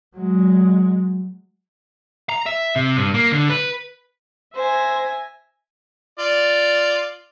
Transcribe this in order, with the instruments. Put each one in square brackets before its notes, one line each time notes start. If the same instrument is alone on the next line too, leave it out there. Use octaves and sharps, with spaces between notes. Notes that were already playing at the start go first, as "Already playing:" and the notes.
[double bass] F#3 G#3
[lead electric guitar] A#5
E5
C3
G2
A#3
D3
B4
[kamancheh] C5 [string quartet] E5 G#5 A#6
[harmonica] F4 D5